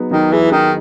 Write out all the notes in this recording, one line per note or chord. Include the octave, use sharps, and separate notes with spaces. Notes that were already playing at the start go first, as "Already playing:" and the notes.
Already playing: F#3 B3 D#4 G#4
D#3 F#3
E3 G#4
D#3 D#4